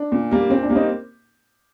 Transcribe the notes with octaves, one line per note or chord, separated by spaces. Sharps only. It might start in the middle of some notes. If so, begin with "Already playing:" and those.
Already playing: D4
A#2
G3 A#3
A#2 C4
D4
G3 A#3
C4 D#4